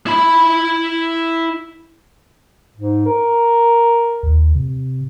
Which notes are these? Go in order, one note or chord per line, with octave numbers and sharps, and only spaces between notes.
E4 B5
G#2
A#4
D#2
C3